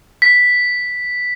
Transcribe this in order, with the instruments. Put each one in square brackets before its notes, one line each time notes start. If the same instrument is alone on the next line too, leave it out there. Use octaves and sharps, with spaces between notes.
[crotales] B6